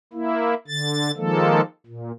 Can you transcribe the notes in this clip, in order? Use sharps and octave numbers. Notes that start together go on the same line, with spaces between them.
A#3 E4
D3 A6
D#3 F3 G#3 A#3 A4
A#2